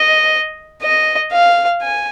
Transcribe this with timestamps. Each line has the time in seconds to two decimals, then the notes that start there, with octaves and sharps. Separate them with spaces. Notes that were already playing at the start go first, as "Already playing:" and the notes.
Already playing: D#5
0.82 D#5
1.32 F5
1.82 G#5